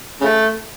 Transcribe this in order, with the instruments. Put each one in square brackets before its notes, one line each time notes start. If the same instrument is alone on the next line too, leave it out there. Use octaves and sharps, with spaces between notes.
[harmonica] C#3 A3